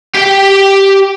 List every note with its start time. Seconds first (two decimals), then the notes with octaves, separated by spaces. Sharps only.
0.15 G4 G5